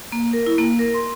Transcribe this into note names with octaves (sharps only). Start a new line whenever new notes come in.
A#3
A#4
E4
A#3
A#4
C6